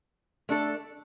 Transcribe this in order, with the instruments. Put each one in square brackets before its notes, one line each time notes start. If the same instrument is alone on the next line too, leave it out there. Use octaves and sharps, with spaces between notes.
[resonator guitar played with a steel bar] A3 D4 A4